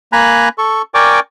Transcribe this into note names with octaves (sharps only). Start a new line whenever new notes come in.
A#3 G#5 A#5 B5 F#6
A4 C#6
A#4 D5 G5 G#5 C#6 D6